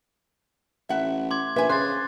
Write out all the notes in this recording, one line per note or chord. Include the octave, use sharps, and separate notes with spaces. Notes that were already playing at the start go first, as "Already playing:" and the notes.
A1 E5 F#5
C6 D6 G#6
A#1 B4 E5 G#5
C#3 C5 C6 F#6 A6